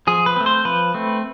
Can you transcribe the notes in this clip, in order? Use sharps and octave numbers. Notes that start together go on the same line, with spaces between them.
F3 G#4
B4
A3 C4
C5
F3 B4
A3 C4